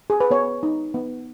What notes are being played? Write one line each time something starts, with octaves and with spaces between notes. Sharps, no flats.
G#4
B4
B3 C#5
D#4
B3